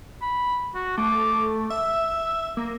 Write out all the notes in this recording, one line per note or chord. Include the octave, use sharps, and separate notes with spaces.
B5
F#4
A3 D6
E5 E6
A#3